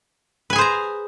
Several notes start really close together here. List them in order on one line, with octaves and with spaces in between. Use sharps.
B4 G#5 G#4 C5 A#5